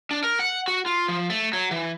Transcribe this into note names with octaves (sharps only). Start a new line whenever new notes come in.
D4
A#4
F#5
F#4
F4
F3
A3
F#3
E3